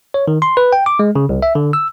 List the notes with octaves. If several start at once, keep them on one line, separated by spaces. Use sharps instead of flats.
C#5
D#3
C6
B4
G5
D6
G#3
C#3
C2
E5
D3
E6